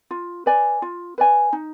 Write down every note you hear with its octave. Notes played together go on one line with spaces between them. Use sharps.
F4
B4 D5 G#5
F4
B4 D5 G#5
D#4